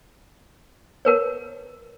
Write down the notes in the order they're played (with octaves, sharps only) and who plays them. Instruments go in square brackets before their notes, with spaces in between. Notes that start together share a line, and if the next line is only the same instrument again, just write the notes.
[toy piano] A#4 B4 C#5